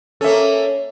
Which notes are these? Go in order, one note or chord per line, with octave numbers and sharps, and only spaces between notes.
A#3 C#4 A4 E5